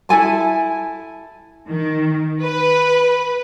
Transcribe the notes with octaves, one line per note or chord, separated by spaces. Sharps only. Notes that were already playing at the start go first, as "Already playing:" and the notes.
E4 A4 G#5 A5
D#3
B4